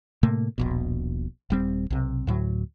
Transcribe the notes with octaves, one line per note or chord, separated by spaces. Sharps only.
A2 C3 A3 A#3
D#1 A#1 B2
D#1 G3 C4
B1 C3
D2 A2 F#3